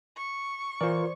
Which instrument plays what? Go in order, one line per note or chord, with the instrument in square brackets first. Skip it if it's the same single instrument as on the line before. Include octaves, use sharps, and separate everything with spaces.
[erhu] C#6
[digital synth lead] E3 [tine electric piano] F4 A#4 [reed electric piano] C5 D5